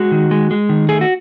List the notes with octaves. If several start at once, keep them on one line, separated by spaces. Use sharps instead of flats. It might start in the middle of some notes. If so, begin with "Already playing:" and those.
Already playing: G#3 F#4
D#3
G#3
G#3
D#3
A3 G#4
F#4